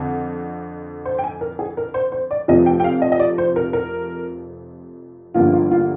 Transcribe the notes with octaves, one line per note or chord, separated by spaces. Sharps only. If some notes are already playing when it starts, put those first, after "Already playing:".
Already playing: F2 D3
C5
G5
G#5
A#4
G#4
A#4
C5
C5
D5
F1 F2 C3 F3 D#5
G5
G5
F5
D#5
D#5
D5
C5
A#4
A#4
G1 G2 D3 F3 A#3 F4
F4
F4